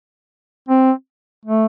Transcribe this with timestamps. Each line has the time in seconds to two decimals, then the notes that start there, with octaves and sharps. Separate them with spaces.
0.69 C4
1.45 A3